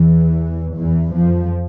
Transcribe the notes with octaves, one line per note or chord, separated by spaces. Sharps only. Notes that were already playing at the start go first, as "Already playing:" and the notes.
Already playing: E2 E3
E2 E3
F2 F3